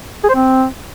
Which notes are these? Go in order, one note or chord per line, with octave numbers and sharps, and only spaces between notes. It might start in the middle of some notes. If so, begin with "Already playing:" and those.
G#4
C5
C4